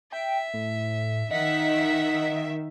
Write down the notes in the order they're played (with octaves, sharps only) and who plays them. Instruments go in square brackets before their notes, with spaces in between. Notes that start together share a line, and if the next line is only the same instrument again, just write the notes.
[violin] E5 [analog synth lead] G5
[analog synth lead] A2
[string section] D#3 E5 [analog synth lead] D#5 [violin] F#5 B6